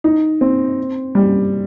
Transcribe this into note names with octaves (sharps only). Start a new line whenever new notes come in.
D#4
C4
G3